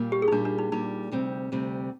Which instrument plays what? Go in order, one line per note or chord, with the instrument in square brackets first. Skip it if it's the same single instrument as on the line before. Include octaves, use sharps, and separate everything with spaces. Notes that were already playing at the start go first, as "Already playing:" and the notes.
Already playing: [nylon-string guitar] A#2 G3 A#3
[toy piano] G4
G#4
D#4
[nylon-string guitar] A#2 G3 A#3 [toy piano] D4
[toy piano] D4
D#4
[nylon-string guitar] A#2 G3 A#3 [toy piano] D#4
[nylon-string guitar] D2 C3 G3 C4
D2 C3 G3 C4